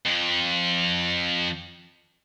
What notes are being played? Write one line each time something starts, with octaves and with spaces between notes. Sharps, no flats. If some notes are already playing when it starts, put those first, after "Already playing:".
F2 F3